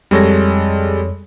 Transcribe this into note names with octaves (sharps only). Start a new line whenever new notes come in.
F2 G3 G#3 A4 C#5 A#6